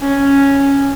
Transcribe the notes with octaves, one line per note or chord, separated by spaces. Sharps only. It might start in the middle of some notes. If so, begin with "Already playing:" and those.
C#4